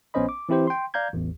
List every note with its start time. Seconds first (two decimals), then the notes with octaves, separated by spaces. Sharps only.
0.14 A#1 B3 C#4 C5 D#5 B5
0.29 D6
0.49 E3 C4 E4 G4 C5
0.67 G5 C6
0.94 D5 F5 A#5 G6 G#6
1.13 A1 E2